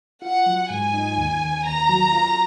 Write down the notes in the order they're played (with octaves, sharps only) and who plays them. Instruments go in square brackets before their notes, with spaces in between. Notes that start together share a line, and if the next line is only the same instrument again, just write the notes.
[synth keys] F4 [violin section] F#5
[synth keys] F#3
[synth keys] G#2 [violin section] G#5
[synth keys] D#4
D#2
D#2
[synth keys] D#2 [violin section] A#5
[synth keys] F#3
F4